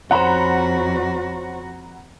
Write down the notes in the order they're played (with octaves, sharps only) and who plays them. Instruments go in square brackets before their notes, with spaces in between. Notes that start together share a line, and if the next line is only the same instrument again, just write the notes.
[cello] F2 F#4 [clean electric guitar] C#4 C5 [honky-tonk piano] F#5 A#5 B5